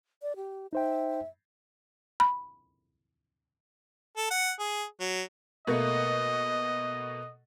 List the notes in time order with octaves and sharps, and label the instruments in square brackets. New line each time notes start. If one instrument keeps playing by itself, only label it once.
[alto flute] D5
G4
[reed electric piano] D#4 C5 G5 [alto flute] E5
[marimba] B5
[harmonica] A4
F#5
G#4
F#3
[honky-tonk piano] B2 A3 A#3 [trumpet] D#5